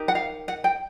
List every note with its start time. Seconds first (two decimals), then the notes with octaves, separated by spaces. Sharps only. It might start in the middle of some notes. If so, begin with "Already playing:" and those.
Already playing: D#4 G4 A#4
0.08 F#5
0.15 F5
0.48 F#5
0.64 G5